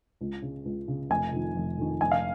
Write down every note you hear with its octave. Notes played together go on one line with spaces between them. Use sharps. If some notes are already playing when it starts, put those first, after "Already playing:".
C#2
C#3
C#2
C#3
F1 G#5
F2 D#3
F1
F2 D#3
F1 G#5
F5